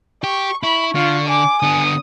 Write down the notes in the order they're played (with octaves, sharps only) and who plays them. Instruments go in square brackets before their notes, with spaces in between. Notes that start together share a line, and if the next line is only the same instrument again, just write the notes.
[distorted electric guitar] G4 [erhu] C#6
[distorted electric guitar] E4 [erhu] B5 [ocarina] C#6
[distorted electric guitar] D3 [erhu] F4
[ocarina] G#5 [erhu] D6
[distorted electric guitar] D3 B3 [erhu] D#6